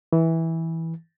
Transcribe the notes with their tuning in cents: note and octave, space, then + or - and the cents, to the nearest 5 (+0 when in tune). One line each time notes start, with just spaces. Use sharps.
E3 -15